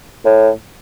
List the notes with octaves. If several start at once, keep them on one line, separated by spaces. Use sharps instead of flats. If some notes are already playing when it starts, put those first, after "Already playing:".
A2